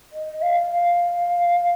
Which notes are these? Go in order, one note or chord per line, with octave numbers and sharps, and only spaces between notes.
D#5
F5
F5